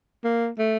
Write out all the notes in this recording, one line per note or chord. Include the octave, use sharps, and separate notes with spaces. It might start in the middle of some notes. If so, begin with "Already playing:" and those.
A#3
A3